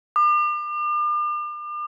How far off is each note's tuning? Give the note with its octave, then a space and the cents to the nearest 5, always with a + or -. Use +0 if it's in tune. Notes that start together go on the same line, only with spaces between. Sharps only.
D6 +40